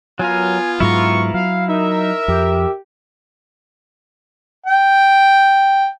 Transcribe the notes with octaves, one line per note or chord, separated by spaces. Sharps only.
F#3 B3 F4 A#4 G#5
G#2 F#3 E4 A#5 C#6
F#3 F5
D#4 A#4 E5
F2 G4
G5